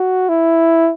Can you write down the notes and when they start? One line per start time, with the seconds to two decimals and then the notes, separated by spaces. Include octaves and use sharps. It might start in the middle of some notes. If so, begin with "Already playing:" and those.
Already playing: F#4
0.29 E4